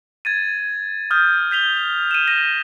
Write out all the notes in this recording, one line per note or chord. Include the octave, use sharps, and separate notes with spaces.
G#6 A6 D#7
D#6 F6 G6
G6 B6 F7 G7
D#7 E7
A#6 D#7